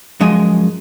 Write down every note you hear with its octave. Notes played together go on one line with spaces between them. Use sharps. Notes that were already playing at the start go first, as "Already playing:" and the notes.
F#2 F3 G#3 G#4 D#5 G#5